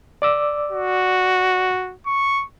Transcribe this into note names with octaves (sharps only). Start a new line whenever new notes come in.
D5 D6 E6
F#4
C#6